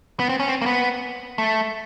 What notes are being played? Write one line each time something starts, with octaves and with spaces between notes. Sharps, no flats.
B3
C4
C#4
C4
A#3
B3
A3